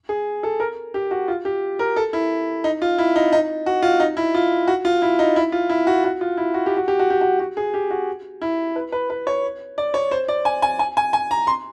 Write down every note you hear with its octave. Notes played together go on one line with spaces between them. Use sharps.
G#4
A4
A#4
G4
F#4
F4
G4
A#4
A4
E4
D#4
F4
E4
D#4
D#4
F#4
F4
D#4
E4
F4
F#4
F4
E4
D#4
E4
F4
E4
F#4
F#4
F4
E4
F#4
G4
F#4
G4
F#4
G4
F#4
F#4
G#4
G4
F#4
E4
B4
B4
B4
C#5
D5
C#5
C5
D5
G#5
G#5
G#5
G#5
G#5
A#5
C6